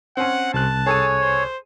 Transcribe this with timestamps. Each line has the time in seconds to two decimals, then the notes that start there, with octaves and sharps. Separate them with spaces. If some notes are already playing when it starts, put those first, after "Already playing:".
0.17 C4 C#4 F#5
0.54 C2 A5 F#6
0.86 G#4 A4 C#5 G#5
1.21 C5